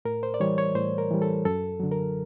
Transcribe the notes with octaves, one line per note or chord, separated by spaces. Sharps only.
A2 A#4
C5
D5
E3 G3 C#5
C#5
A2 C5
A#4
E3 G3
A4
F#2 A4
D3 F#3
A#4